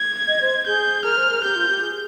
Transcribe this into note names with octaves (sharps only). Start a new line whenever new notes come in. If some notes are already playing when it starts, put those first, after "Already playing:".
Already playing: G#6
D#5
C5
G#4 G6
A#4 F6
C5
A#4
G4 G6
F4
G4
G#4